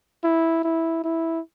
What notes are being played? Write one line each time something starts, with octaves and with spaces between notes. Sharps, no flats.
E4
E4
E4